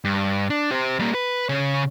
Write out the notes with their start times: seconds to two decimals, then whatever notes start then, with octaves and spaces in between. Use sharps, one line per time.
0.05 G2
0.50 D4
0.71 G4 C5
0.99 G3 A#3
1.15 B4
1.49 C#3 C#5